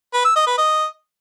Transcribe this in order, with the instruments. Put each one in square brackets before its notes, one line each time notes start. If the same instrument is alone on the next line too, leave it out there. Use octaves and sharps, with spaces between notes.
[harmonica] B4
E6
D#5
B4
D#5